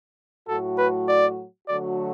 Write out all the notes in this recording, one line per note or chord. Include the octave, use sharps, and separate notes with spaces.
A2 F#3 A3 F#4 A4
B4
D5
D3 F#3 A3 F#4 D5